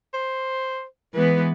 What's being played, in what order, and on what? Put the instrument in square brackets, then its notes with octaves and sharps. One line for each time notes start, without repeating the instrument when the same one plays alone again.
[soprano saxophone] C5
[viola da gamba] E3 G#3 B3 [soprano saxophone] B4